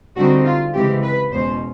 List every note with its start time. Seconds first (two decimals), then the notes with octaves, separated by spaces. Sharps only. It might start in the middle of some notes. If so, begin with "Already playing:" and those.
0.17 D3 G3 C4 D#4 F#4
0.45 F4
0.74 C#3 E3 G#3 C4 G4
1.03 B4
1.32 E2 B2 G#3 C#4 C5